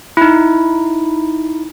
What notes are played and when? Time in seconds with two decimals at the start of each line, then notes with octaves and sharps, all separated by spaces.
0.17 D#4 E4